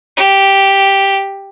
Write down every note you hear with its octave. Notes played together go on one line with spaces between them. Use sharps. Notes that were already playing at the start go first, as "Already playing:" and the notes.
G4